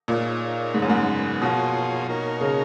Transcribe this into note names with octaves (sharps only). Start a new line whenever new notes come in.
A#2 A#3 D#4 G#4 C#5
G#2 C#3 G#3 B3
F#2
G#2
B2 F3 A#3 F4 G#4 C#5
A#3 D#4 A#4 C#5
C#3